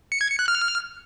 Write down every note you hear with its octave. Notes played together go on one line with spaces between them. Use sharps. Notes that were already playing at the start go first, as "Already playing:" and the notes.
C#7
G#6
C#7
F#6
F6